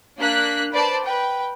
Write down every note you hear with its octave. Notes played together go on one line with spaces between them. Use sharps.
A#3 D4 F#6 B6
B4 C5 D5 A5
B4 G5